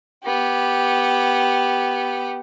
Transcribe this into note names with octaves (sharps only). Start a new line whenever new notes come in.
B3 G4